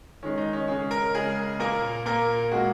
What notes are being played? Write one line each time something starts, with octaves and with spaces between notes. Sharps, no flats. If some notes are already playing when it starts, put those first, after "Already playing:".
D#3 G#3 C#4
D#4
C#4
C#3 G#3 C#4
A#4
C#3 G#3 G#4
A#2 A#3 A#4
A#2 A#3 A#4
A#2 G#3 F#4